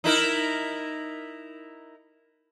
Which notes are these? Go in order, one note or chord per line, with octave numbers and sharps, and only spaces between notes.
D#4 E4 A#4